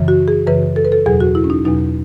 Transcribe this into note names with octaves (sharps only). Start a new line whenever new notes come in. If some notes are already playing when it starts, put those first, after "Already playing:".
Already playing: F#2 C#3 E3
F#4
G#4
F#2 C#3 E3 B4
A4
B4
A4
E2 B2 F#3 G#4
F#4
E4
C#4
D#4
E2 B2 F#3 D#4